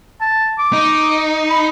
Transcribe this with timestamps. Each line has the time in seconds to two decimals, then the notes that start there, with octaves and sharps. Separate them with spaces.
0.21 A5
0.59 D6
0.73 D#4
1.50 B5